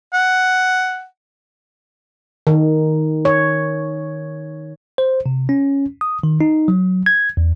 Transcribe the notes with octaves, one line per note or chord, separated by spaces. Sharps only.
F#5
D#3
C#5
C5
C3
C#4
D#6
D#3
D#4
F#3
G#6
E2